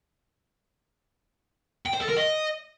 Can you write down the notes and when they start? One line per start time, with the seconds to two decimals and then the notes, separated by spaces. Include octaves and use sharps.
1.86 G5
1.94 C5
2.01 A4
2.09 A#4
2.17 D#5